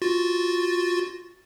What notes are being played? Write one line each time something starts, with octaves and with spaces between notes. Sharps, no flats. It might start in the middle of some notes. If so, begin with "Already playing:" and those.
F4 F#4 A6